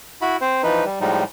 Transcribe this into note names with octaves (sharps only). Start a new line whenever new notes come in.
E4 F#4 B5
C4 C5
E3 F3 D#4 B4
G3
A2 F3 G3 G#3 D#4